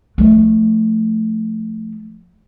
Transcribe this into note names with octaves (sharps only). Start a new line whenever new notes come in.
F3 A3